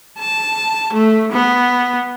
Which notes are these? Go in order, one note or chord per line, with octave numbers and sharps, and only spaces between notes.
A5
A3
B3